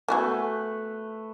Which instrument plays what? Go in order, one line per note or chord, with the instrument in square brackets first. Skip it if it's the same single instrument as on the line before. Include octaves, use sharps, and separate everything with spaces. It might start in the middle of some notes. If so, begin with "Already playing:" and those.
[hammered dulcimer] A3 B4 [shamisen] B3 F#4 G#4